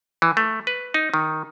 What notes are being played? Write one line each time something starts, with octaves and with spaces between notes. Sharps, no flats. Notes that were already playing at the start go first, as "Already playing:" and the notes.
E3
A3
B4
D#4
D#3